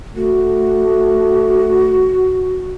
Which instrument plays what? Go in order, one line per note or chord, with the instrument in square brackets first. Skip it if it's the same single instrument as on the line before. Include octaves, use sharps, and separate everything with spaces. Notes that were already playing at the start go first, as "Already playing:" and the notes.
[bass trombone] A3 [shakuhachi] F#4